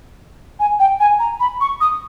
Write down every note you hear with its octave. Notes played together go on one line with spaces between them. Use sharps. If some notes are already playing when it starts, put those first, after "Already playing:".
G#5
G5
G#5
A#5
B5
C#6
D#6